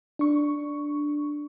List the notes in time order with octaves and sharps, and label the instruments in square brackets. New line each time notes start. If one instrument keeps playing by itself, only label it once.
[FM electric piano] D4 C#6